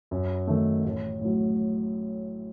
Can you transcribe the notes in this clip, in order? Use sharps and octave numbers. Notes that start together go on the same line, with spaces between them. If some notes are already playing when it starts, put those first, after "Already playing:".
F#2
D#3 A3
A1
A2 F#3